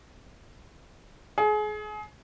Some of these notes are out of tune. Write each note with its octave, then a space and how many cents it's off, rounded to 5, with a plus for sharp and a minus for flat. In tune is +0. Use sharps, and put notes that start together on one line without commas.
G#4 +30